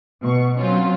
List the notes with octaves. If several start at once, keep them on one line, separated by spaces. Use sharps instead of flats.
B2 C#6
F#3 C4 C#4 F4